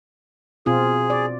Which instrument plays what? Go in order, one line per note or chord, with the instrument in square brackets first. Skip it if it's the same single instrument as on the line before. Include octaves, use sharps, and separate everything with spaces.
[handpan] B2 C4 F4 [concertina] G#4
[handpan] D5